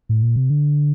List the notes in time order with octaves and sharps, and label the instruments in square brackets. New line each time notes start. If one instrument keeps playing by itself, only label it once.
[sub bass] A2
A#2
C3
D3